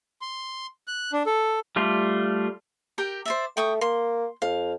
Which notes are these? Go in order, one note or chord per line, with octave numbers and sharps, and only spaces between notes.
C6
F#6
D4
A4
G3 A3 F4
G4 A#4 G5
C5 D5 E5
A3 G5 C#6 D#6
A#3 C6
F2 F5